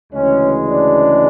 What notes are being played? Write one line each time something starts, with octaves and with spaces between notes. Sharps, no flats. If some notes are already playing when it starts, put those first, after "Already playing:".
D2 C#3 E3 G#3 C#4
D4